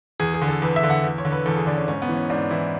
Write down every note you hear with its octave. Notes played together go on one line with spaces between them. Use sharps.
E2 G#4
G#4
D3
A4
E2 B4
E5
D3
F#5
E2
C#5
D3
B4
E2 A4
G#4
D3 D4
C#4
G#2 C#4
B3
E3
C#4
G#2 D4
E3 E4